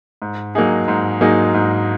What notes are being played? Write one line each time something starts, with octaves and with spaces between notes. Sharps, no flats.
G#2
F#3 A#3 D#4 G#4
G#2
F#3 A#3 D#4 G#4
G#2